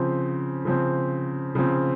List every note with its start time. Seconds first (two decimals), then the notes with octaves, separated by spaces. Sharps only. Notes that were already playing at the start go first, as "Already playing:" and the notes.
Already playing: C#3 F3 C4
0.65 C#3 F3 C4
1.55 C#3 F3 C4